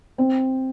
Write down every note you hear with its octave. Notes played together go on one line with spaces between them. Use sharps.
C4